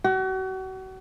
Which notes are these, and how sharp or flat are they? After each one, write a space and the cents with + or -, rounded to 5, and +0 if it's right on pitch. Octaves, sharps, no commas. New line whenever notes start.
F#4 +35